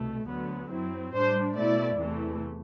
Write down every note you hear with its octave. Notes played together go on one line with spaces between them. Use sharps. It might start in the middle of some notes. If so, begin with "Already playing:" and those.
Already playing: C2 B2 A3
D2 D3 F#3 B3
F#2 F#3 C4 E4
A2 G3 D4 C5
B2 A3 E4 D5
E2 C3 E3 A3